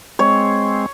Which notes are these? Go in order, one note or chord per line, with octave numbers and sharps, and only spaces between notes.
G#3 C4 C#5